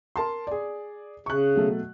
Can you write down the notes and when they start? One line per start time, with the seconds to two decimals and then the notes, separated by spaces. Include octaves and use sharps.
0.16 A#4 A5 C6
0.47 G#4 D5
1.26 C#3 C#6 F#6
1.55 B2 F#3 A3